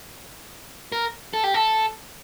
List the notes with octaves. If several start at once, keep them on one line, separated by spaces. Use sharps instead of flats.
A#4
A4
G4
A4